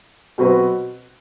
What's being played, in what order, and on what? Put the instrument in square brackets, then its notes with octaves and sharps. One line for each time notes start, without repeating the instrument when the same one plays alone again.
[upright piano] B2 F#3 C4 F#4 B4